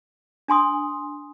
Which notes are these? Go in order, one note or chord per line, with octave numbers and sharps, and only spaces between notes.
D4 G#5 C6 D#6